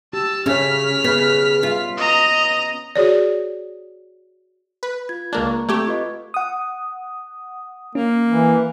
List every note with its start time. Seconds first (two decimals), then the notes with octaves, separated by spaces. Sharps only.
0.13 G4 A5 E6
0.46 C#3 C#4 C#5 F6 B6
1.04 C#3 B3 B4
1.63 F4
1.97 D#5 A#5
2.96 F#4 G#4 C#5 D5
4.83 B4
5.09 F4 G#6
5.33 C#2 A#3 D4
5.45 A#5 C#6
5.69 A3 C4 G4 C#6 G#6
5.87 F4 B4 D#5
6.34 F#5 D#6
7.95 A#3 C#4
8.29 E3